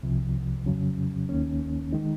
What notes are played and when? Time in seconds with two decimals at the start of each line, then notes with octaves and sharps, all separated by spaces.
0.03 C2 C3 F3
0.66 F2 C#3 F#3 C#4
1.29 D#2 D#3 A#3 C#4
1.93 D#3 G#3 D#4